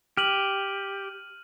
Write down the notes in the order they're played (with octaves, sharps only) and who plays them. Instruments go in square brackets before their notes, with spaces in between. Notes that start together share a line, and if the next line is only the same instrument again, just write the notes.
[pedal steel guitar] G4 [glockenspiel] F6 D#7 F#7